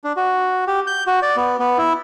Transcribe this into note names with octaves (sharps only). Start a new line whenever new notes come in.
D4
F#4
G4
G6
F#4
D5
B3
B3
E4